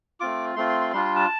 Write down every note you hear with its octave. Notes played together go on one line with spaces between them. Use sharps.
A3 C4 F4 D6
A3 C4 F4 C6
C6
C6
G3 D4 F4 C6
C6
A5